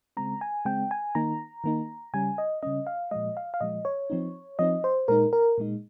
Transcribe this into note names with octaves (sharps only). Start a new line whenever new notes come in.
C#3 G#3 C4 A#5
G#5
C#3 G#3 C4 G5
G#5
D#3 A#3 D#4 A#5
D#3 A#3 D#4
C#3 G3 C#4 G#5
D#5
C#3 G3 C#4 D#5
F5
A#2 F3 G#3 D#5
F5
F5
A#2 F3 G#3 D#5
C#5
F3 C4 D#4
F3 C4 D#4 D#5
C5
A#2 G#3 D#4 A#4
A#4
A#2 G#3 D#4